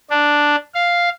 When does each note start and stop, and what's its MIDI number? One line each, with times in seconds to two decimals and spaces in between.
0.10 0.56 62
0.74 1.09 77